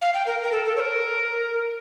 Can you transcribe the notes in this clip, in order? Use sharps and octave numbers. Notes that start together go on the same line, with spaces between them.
F5
G5
A#4
A#4
A4
A4
C#5
A#4